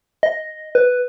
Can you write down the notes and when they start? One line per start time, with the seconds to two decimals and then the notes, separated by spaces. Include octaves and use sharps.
0.23 D#5
0.75 B4